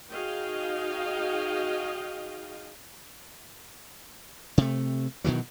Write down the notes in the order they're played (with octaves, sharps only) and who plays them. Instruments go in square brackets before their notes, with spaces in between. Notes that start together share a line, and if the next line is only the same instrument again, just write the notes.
[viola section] D#4 F#4 G#4 D#5 F5 G5
[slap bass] C3 A3
B2 D#3 E3 F#3